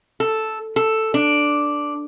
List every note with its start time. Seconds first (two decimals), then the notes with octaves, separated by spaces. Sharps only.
0.20 A4
0.76 A4
1.14 D4